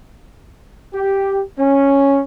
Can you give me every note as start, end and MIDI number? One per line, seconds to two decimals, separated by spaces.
0.94 1.41 67
1.59 2.21 61